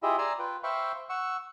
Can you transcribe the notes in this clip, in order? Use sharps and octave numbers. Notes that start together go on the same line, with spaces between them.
E4 F4 G4 G#4 D#5 E5
D5 G#5 A#5 C6 E6
F4 B4 G5
C5 E5 F5 G5 B5 C#6
F#5 C#6 E6